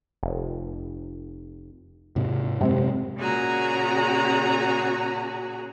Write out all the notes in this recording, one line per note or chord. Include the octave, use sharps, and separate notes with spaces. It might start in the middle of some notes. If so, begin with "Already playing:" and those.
F1
G#2 C3
F#2 C3 G#3 C4
A#2 C#3 F#4 G#4 A#5